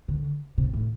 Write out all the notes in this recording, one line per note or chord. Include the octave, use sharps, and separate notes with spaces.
D3
C3
A2